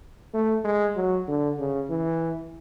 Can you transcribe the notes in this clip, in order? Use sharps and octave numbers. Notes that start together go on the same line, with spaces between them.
A3
G#3
F#3
D3
C#3
E3